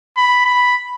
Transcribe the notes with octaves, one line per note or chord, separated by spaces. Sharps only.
B5
B5